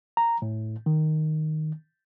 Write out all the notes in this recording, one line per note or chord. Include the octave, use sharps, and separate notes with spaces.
A#5
A2
D#3